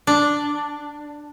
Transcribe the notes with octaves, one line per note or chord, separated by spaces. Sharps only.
D4